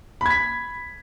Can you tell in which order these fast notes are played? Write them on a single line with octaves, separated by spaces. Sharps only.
B5 G#6 B6